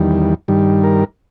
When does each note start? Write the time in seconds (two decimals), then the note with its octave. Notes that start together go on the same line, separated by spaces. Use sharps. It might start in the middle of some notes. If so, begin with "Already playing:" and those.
Already playing: E2 D#3 G3
0.48 G2 D#3 G3
0.84 A#4